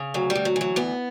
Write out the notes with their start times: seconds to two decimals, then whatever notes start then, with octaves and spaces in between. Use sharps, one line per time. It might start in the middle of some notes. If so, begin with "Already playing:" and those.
Already playing: C#3
0.14 D2 F#3
0.30 G3
0.35 D2
0.45 F#3
0.56 E3 F#3
0.76 D2 B3